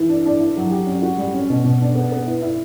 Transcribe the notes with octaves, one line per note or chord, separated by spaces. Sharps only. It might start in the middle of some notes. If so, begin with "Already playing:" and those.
Already playing: E3
D4
D4
E4
F#3
G4
C#4
F#4
G3
C#4
B2
B2
D4
B3
B3
E4
E4